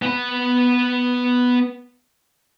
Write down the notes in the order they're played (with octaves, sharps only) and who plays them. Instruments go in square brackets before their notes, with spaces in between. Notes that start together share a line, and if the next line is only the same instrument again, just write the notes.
[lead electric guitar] B3 B4